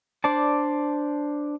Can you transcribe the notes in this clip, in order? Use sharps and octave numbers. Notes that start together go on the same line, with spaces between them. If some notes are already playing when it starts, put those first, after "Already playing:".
D4 C5 D5 A5